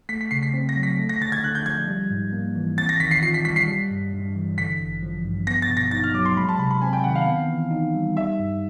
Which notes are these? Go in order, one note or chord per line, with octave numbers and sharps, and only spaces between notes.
A3 B6
B6
C#3 C7
B6
C4
A#6
F#3
B6
A3
A#6
D3 A6
G#6
D3 F#6
G6
F3 G#6
G3
G#2
A#3
E3
C4 A6
A#6
D#3 B6
C7
F4 C7
B6
G3 B6
C7
G3
G2
G2
E3
D3 B6
A1
F3
G2
B3 A#6
A6
B2
A#6
D#4 A6
F6
F#3 D6
C6
G#3 B5
A5
C3 B5
B5
C4 G#5
G5
D#3 F#5
F5
B3
E3
D#4
G3
G3 E5
G2